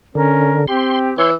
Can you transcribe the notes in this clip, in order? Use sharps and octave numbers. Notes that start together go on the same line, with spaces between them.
D3 C#4 A#4
C4 G4 C6
E3 C#5 C6 E6